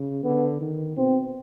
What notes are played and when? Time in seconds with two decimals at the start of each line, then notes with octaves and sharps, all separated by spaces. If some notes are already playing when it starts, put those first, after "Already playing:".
Already playing: C#3
0.24 D3 B3
0.61 D#3
0.97 B2 C4